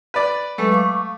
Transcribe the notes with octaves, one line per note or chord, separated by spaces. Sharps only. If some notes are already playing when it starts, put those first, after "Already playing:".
B4 D5
F#3 G#3 A3 B4
F5 C#6 D6